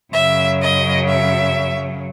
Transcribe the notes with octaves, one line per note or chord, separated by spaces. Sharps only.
F#2 C#3 F#3 E5
D#5
E5